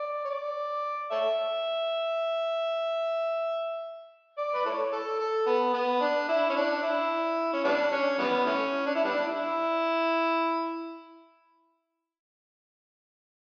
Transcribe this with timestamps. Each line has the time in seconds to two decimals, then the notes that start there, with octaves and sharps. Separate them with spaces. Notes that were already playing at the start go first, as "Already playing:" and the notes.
Already playing: D5
0.25 C#5
0.30 D5
1.12 A4 C#5 E5
4.38 D5
4.54 B4
4.66 E4 A4 C#5
4.92 A4
5.20 A4
5.46 B3
5.74 B3
6.01 D4
6.29 E4
6.50 C#4
6.56 D4
6.83 E4
7.54 C#4
7.64 G3 B3 D4
7.92 C#4
8.19 E3 G3 B3
8.46 E3 A3 C#4
8.87 D4
8.95 E4
9.04 G3 B3 D4
9.27 E4